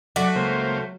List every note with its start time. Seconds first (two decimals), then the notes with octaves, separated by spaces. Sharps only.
0.16 F#3 A3 F#4 D5 F#5
0.36 C#2 A#3 C5